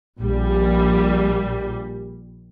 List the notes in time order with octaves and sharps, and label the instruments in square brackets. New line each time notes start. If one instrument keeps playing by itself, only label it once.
[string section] A#1 G3